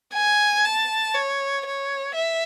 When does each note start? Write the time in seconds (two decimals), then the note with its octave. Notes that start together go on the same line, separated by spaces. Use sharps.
0.14 G#5
0.65 A5
1.15 C#5
1.65 C#5
2.15 E5